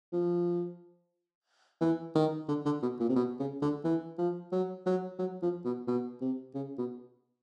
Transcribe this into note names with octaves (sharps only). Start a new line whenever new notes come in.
F3
E3
D#3
D3
D3
B2
A#2
C3
B2
C#3
D3
E3
F3
F#3
F#3
F#3
F3
B2
B2
C3
C#3
B2